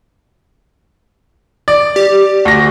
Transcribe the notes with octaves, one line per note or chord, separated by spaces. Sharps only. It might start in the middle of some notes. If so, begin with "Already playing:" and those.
D5
G4
D2 A#6